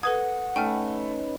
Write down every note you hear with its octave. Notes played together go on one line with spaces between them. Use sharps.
A4 B4 F#5 D#6 G#6
A3 C#4 D#4 B4 G5 G#5 F6